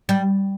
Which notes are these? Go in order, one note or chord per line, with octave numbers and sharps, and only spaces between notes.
G3